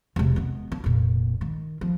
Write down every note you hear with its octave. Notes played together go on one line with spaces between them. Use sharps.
E1 C3
G#3 B3
D4
F1 A#2
D#3
F3